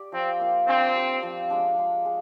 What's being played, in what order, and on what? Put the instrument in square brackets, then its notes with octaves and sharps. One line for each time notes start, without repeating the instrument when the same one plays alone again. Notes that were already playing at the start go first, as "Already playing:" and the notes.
Already playing: [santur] G4 D5
[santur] F3 [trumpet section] C4
[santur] A#3 F4
[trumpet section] C4 [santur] D4
[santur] G4 D5
F3
G#3 D4
G#3
G#4